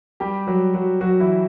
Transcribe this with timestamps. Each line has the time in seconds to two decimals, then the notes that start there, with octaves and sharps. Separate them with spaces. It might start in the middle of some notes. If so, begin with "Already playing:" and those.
0.20 G3 G4
0.47 F#3 F#4
0.74 F#3 F#4
1.01 F#3 F#4
1.20 E3 E4